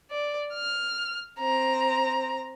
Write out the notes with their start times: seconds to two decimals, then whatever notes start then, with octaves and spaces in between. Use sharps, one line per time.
0.11 D5
0.54 F6
1.39 C4 A#5